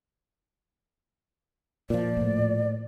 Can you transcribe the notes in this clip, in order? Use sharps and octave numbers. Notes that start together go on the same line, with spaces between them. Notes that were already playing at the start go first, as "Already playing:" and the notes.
A#2 F3 D5
A2 A#3